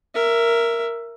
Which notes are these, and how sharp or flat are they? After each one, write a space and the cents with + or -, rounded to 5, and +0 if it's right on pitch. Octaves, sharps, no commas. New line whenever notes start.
A#4 +0 E5 +15